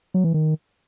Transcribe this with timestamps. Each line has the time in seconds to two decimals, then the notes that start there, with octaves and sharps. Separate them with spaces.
0.14 F#3
0.24 E3
0.34 D#3